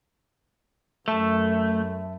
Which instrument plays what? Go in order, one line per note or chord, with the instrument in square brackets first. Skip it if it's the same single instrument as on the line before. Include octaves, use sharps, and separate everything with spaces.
[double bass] F#2 [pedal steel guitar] A3 [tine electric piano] E5 A5